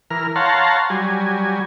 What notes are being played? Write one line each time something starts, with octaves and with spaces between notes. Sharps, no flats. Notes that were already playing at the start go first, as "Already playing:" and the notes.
E3 A#4 F6
C#5 F5 F#5 A5 A#5 C6
F#3 G3 G#5